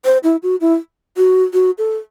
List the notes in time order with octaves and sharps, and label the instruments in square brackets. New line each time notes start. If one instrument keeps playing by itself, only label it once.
[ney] C5
E4
F#4
E4
F#4
F#4
A4